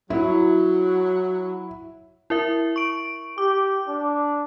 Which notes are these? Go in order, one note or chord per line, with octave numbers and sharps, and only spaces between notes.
F#3 E4
E4 A#4 E5
C#6 D7
G4 D6
D4